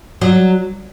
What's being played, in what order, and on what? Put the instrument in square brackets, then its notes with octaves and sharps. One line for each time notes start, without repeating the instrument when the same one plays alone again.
[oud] F#3